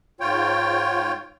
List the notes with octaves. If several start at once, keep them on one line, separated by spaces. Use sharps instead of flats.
G#2 F4 C#5 G5